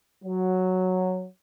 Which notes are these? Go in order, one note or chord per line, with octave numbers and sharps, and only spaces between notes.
F#3